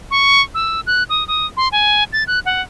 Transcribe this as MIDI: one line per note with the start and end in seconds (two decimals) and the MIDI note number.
0.11 0.41 85
0.55 0.81 88
0.87 1.03 90
1.09 1.26 87
1.28 1.46 87
1.57 1.68 84
1.72 2.04 80
2.13 2.24 93
2.27 2.40 90
2.45 2.61 78